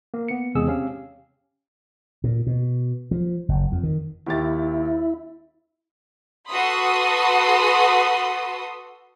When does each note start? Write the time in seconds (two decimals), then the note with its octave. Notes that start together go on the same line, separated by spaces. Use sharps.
0.14 A#3
0.28 B3 C#7
0.55 E2 C3 G#3 G#4 E6
0.67 C4 C#4 G4 F5
2.24 A#2
2.47 B2
3.11 F3
3.49 F#1
3.72 F2
3.83 D#3
4.27 D#2 E4 G4 A6
6.49 F#4 A4 B4 B5 C6 D#6